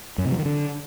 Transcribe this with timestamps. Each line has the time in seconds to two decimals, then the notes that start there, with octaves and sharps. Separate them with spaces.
0.18 F#2
0.25 C3
0.32 F#3
0.38 D#3
0.45 D3